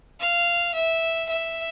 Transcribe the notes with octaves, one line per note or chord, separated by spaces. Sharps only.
F5
E5
E5